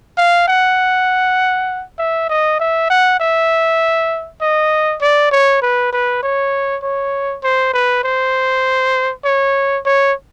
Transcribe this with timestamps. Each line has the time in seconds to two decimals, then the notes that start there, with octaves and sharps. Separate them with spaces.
0.18 F5
0.48 F#5
1.99 E5
2.30 D#5
2.60 E5
2.90 F#5
3.20 E5
4.41 D#5
5.01 D5
5.31 C#5
5.62 B4
5.92 B4
6.23 C#5
6.83 C#5
7.43 C5
7.73 B4
8.04 C5
9.25 C#5
9.85 C#5